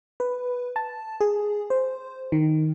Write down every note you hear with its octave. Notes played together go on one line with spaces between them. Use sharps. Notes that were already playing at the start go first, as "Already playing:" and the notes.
B4
A5
G#4
C5
D#3